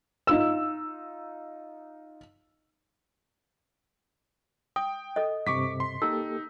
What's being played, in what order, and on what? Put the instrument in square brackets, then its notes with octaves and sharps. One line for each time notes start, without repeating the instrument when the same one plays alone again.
[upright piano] D#4 F4 E6
[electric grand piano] G5 [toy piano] D#6
[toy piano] A4 D#5
[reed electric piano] G2 C3 [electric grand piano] C#6 D6 B6
[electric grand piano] C6
[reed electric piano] A#3 G4 A4 [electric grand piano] D#4 [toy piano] E6